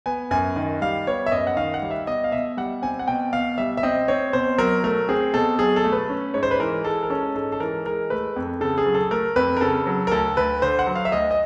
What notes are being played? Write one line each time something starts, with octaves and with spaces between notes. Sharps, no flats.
B3 G#5
F#2 G#5
D#3
G3 F5
B3 C#5
E5
F#2 D#5
F#5
D#3 F5
F#5
G3 F5
E5
B2 D#5
F5
B2 E5
G3 F#5
C4 G#5
F#5
B2 G5
B2 F5
G3 E5
E5
C4 D#5
C4 C#5
B2 C5
F#3 A#4
A3 A#4
C4 G#4
B2 A4
F#3 G#4
A4
A3
B4
C#4
G#2 C#5
C5
B4
E3 A#4
G#3 A4
A#4
C#4 A4
G#2 A4
A4
E3 A#4
G#3 A#4
A3 B4
F2
C#3 A4
G#4
F#3
A4
A3 A#4
F2 B4
A#4
C#3 A4
F#3
A#4
D2 A4
D2 B4
D3 C5
F#5
F#3
F5
E5
D2 D#5
D#5